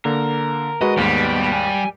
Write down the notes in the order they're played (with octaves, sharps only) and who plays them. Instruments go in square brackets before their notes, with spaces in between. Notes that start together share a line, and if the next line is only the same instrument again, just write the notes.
[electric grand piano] D3 A#3 [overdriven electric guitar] A#4
[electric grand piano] G#3 F#4 B4 [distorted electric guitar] D#5
[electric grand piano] D#2 G#2 [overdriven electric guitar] B2 B3 [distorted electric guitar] G3
[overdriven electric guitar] G#5